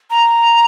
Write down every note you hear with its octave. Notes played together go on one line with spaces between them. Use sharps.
A#5